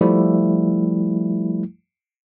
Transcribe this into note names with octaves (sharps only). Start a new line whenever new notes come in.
F3 G3 A3 E4